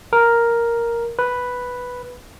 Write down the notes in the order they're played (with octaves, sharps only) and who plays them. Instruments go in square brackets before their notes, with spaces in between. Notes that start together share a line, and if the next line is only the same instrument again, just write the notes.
[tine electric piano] A#4
B4